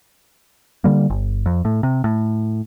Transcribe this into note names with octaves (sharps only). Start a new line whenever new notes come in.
D3 G3 A#3
G1
F2
A2
C3
A2